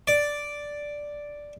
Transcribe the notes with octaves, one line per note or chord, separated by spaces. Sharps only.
D5